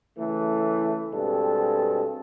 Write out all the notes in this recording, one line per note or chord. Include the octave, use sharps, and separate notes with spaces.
C#3 E3 A3
G2 B2 G#3 C4 A4